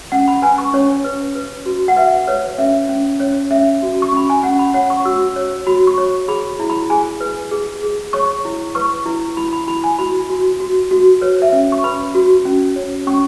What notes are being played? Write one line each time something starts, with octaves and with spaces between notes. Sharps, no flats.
C#4 F#5
B5
B4 G#5
C#6
C#4 C#5
B4
B4
F#4
F#5
B4 E5
B4 C#5
C#4 E5
C#4
C#4 C#5
C#4 E5
F#4
C#6
C#4 B5
G#5
C#4 F#5
B5
C#5 F#5
C#6
F#4 E6
C#5
F#4 B5
C#6
C#5
G#4 B5
E4
B5
G#4 G#5
B4
G#4
G#4
C#5 C#6
E4
B4 C#6
E4
E4 B5
B5
E4 B5
G#5
F#4 B5
F#4
F#4
F#4
B4 C#5
E5
C#4
C#6
B4 B5
F#4
C#4
C#5
C#4 C#6